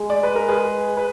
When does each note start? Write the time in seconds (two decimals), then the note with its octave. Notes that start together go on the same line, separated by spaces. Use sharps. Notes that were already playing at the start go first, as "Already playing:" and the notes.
Already playing: G#3
0.10 D5
0.23 B4
0.35 A#4
0.48 G#4 B4
0.97 B4